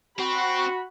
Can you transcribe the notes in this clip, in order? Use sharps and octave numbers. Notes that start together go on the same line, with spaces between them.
C4 F#4 B5